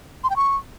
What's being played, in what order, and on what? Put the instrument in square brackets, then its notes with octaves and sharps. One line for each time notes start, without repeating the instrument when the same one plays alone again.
[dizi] C6
G5
C#6